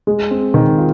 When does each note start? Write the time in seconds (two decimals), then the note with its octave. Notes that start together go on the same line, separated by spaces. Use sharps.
0.07 G#3
0.31 C4
0.54 D#3
0.78 F4